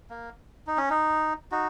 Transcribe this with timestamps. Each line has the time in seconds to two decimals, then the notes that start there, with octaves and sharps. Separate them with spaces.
0.10 A#3
0.67 D#4
0.78 C#4
0.90 D#4
1.52 D#4 F#4